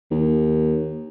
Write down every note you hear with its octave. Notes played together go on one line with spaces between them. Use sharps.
D#2